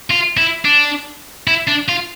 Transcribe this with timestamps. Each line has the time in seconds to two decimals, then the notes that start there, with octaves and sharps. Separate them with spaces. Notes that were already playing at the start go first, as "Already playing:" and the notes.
0.10 F4
0.37 E4
0.65 D4
1.47 E4
1.68 D4
1.88 F4